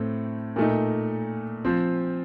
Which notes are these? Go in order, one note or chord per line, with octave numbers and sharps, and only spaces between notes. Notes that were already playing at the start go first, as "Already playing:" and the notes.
Already playing: A2 A3 C4
A#2 A3 D#4
F3 C4